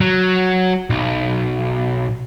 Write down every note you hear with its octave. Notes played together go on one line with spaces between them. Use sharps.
F#3
B1